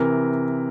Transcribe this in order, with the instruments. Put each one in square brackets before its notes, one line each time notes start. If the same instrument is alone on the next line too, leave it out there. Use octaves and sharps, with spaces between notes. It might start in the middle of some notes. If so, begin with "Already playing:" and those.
Already playing: [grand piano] C3 E3 A#4